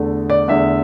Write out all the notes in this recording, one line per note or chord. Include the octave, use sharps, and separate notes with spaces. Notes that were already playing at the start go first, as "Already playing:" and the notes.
Already playing: E2 D3 A3
D5
E2 D3 A3 E5